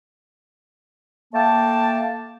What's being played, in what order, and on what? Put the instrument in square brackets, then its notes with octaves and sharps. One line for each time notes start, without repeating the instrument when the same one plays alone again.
[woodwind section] A3 A#3 G5 A5